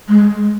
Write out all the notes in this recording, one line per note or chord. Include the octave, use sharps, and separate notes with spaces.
G#3